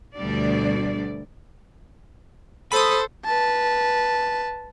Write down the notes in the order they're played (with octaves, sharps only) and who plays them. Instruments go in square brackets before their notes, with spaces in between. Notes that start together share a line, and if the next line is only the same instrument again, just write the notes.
[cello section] D2 B2 G3 D4 D5
[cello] A4 C5 [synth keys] B5 D#6
[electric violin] B4 A5